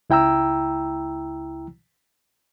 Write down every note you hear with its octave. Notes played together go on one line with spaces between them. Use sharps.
C#2 E4 G5 A#5 E6